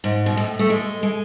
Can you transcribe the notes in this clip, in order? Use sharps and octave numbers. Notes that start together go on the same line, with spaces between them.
G#2
B2
A2
A3
G#3
G#3